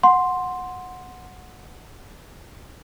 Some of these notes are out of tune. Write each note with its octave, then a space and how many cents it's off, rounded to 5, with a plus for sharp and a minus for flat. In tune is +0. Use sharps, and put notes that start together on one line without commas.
F#5 -15 C6 +0